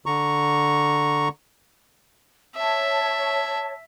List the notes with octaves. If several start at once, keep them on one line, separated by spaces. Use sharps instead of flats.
D3 A#5 C#6
C#5 E5 A5